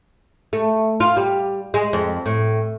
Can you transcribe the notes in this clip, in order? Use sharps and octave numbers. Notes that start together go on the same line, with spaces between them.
A3
F4
G3
G#3
F2
A2